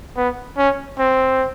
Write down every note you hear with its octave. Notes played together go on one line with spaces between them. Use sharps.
B3
C#4
C4